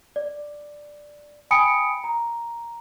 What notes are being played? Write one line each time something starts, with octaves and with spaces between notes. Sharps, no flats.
D5
G5 G#5 B5 D#6 C#7 D7
A#5